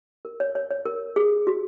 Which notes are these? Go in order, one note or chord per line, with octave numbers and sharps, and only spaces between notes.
A#4
C#5
C#5
C#5
A#4
G#4
F#4